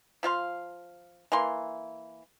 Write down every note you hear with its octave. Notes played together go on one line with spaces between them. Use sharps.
F3 F4 F5 C6
E3 A#3 C6